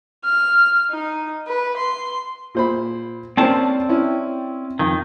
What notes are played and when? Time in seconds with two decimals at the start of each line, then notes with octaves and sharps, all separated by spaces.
0.24 F6
0.90 D#4
1.47 B4
1.77 C6
2.55 A#2 C5 B5
3.37 A#3 C4 C#4 C5 D5 A5
3.89 C#4 E4
4.79 F2 D#3